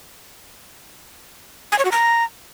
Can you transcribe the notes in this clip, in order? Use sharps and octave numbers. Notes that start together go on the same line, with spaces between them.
G#5
C#5
F#4
A#5